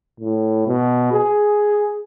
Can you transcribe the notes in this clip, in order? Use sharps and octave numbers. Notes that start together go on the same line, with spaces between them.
A2
B2
G#4